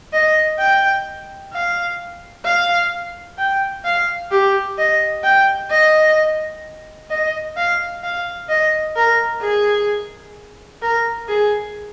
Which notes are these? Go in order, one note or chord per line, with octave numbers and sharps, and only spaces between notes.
D#5
G5
F5
F5
G5
F5
G4
D#5
G5
D#5
D#5
F5
F5
D#5
A#4
G#4
A#4
G#4